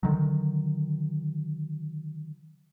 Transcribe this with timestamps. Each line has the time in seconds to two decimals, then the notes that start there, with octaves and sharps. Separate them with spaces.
0.03 D3 D#3 F#3